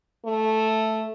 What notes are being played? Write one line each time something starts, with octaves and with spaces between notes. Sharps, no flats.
A3